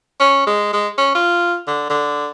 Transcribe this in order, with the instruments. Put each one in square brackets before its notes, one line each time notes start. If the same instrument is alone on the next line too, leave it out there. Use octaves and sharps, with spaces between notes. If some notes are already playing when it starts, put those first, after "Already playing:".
[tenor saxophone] C#4
G#3
G#3
C#4
F4
D3
D3